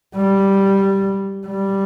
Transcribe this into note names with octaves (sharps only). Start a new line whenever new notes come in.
G3
G3